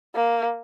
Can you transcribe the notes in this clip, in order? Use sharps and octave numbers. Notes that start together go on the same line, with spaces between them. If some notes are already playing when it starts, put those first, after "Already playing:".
A#3